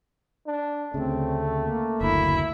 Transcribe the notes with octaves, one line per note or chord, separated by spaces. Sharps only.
D4
D2 C#3 A3 C4
A#3
F#1 D2 E4